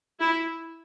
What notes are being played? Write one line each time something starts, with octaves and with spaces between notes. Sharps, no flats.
E4